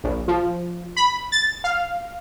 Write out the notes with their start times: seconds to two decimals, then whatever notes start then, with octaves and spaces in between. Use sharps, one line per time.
0.04 A#1
0.28 F3
0.97 B5
1.32 A6
1.64 F5